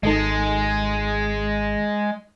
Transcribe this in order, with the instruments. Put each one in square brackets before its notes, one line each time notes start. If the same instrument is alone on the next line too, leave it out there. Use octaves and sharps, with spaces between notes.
[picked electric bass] G#1 [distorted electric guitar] G#3 [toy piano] D#4 A4 D#5